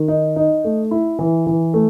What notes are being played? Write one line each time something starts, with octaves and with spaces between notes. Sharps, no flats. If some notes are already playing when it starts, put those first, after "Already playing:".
Already playing: D#3
D#4
D#4
A3
E4
E3
E3
A3